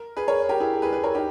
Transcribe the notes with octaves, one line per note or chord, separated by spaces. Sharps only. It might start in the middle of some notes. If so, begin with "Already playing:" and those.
Already playing: A#4
G#4 B4
A#4 C#5
G4 A#4
E4 G#4
G#4 B4
G#4 B4
A#4 C#5
D#4 G4